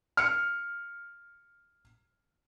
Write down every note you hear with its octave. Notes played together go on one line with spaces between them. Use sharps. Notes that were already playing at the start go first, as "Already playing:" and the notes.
F6 C#7